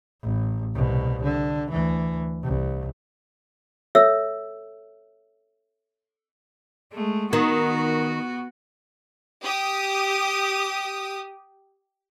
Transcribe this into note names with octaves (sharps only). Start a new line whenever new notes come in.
A1
C2 B2
D3
D2 E3
C2
A4 C#5 E5 E6
G#3 A3
D#3 B3 F#4
G4 D#6